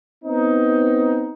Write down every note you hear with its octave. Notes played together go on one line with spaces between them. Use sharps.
B3 C4 D#4